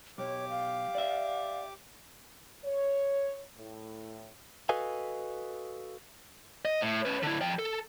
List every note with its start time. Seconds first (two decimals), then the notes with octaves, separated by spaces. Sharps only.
0.18 B1 G4 C#5 D6
0.49 F5
0.95 D5 E5
2.65 C#5
3.58 A2
4.69 F#4 A4 B4 D#5 F5 G#5
6.65 D#5
6.82 A2
7.05 C#4 B4
7.23 D3 E4
7.41 F3 G5
7.59 A4